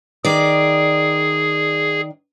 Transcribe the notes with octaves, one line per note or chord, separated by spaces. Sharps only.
D#3 G#4 D5